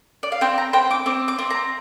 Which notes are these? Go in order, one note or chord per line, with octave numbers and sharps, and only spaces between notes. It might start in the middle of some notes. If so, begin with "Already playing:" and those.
D5
F5
C4 G5
A#5
C4 G5
D6
C4 D6
D6
C4
A#5